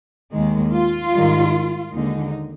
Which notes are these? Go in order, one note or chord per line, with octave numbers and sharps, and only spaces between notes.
D#2 D#3 G#3
F4
G#2 D#3 G3
D#2 D3 G#3 D#4